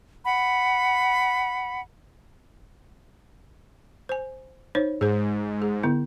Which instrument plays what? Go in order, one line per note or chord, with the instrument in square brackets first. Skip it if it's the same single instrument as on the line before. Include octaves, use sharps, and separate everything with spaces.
[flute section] F#5 B5
[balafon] C5 G#5
D#4 C5 C#5
[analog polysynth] G#2 [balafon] G#4 C5
[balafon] G#4
D3 B3 E4